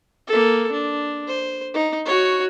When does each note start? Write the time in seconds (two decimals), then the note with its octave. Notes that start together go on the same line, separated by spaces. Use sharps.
0.27 A#3 A4
0.72 D4
1.28 C5
1.74 D#4
2.06 F#4 C#5